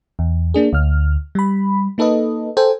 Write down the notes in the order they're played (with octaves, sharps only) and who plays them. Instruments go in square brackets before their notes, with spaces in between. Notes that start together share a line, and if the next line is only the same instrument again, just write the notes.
[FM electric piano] E2
A#3 D4 G#4
D2 F6
G3 B5
A#3 D#4 A4 B4 D#5
A4 C5 G5 G#5